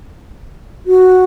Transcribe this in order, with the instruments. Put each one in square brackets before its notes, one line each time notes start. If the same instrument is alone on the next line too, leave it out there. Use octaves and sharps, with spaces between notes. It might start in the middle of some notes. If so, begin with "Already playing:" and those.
[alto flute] F#4